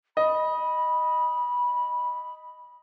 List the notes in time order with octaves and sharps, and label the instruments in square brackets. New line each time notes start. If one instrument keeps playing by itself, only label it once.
[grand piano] D#5 [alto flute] B5